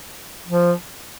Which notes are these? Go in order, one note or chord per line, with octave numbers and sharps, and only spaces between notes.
F3